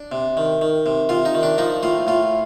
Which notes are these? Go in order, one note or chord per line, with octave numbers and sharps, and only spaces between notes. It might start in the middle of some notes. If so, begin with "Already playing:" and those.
Already playing: D4
C3
D#3
D#3
C3
C3 F4
D#4
D#3
D4
F3 D#4
A2 F4
A2 F4